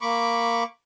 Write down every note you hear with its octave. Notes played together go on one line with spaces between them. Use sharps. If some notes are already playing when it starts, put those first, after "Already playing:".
A#3 B5 C#6 D6